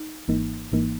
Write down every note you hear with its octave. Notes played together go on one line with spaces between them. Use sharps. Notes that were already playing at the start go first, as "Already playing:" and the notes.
Already playing: D#4
G#1 G#2 E3 A#3 D#4
G#1 G#2 E3 A#3 D#4